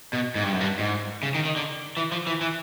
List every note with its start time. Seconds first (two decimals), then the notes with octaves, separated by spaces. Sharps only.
0.13 B2
0.35 G#2
0.43 G2
0.52 F#2
0.61 G2
0.79 G#2
1.23 C#3
1.34 D#3
1.45 D#3
1.56 D3
1.97 E3
2.12 F3
2.27 E3
2.41 E3